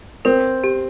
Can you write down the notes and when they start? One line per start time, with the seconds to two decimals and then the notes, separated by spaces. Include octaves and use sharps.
0.25 C4 A#4
0.64 G4